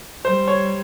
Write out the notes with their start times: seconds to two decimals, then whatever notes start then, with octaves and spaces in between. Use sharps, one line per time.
0.24 G3 C5
0.48 C#5